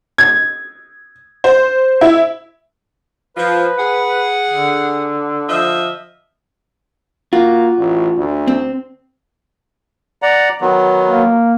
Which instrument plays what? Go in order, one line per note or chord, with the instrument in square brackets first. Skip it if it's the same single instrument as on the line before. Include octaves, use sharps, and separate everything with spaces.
[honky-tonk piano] G#6
C5
E4
[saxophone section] F3 [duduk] B4
[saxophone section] G#4 F#5
[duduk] D3
[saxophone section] F3 D#5 E5
[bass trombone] A#3 [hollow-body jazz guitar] F4 F#4
[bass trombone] A1
D2
[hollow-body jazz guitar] C4
[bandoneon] D5 F#5 A#5
D#3 F#3 B3
[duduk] A#3